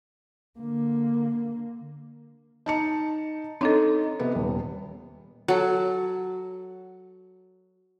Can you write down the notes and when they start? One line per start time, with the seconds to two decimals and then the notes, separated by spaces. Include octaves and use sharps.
0.59 D3 A#3
2.66 D#4 A5 C#7
3.61 C4 D4 D#4 A4 C#5 D#5
4.20 C3 B3
4.35 D#1
5.48 F#3 A4